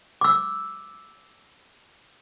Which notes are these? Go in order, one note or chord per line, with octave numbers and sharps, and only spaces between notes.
D6 E6